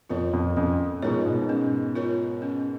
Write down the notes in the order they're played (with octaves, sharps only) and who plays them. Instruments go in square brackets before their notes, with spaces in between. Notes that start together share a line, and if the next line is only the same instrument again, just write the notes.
[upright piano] F2 [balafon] F4 A#4 C#5
[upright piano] F2
[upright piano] F2 [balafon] C#4
[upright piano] G#2 B2 [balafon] F4 A#4 C#5
[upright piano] G#2 B2
[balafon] C#4
F4 A#4 C#5
C#4